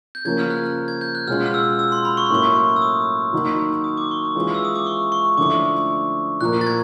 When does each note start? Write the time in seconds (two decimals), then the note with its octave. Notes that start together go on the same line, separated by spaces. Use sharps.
0.15 G6
0.25 C#3 F3 A#3 C#4 G#6
0.39 F6
0.50 F#6
0.88 G#6
1.01 G6
1.15 F#6
1.28 B2 G#3 C#4 F4 F6
1.46 F6
1.54 E6
1.79 E6
1.92 C6
2.05 B5
2.17 C#6
2.26 C6
2.30 A2 F#3 A#3 C#4 C#6
2.76 E6
2.82 D#6
3.33 D#3 F#3 A#3 D#4 F#4
3.84 D#6
3.97 D6
4.11 C#6
4.25 D6
4.35 E3 G#3 C#4 F4
4.54 E6
4.65 D#6
4.76 D6
4.87 C#6
5.12 C#6
5.37 D3 F3 A3 C#4 E4 D6
6.41 A#2 F3 A#3 F#6
6.61 A6
6.66 G#6